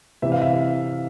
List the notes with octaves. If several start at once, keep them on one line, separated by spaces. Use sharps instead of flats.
C3 E3 E5
F5
E5